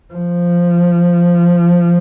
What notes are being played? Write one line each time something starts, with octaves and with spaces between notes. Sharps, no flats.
F3